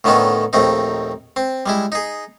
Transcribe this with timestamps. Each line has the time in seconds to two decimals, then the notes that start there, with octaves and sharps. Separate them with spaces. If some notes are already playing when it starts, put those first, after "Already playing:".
0.04 A2 D3 D#3 B3 C#4 D#4
0.53 A#1 D#2 A3 C4 D#4
1.36 C4
1.66 G3 G#3 E4
1.92 D#4 G#4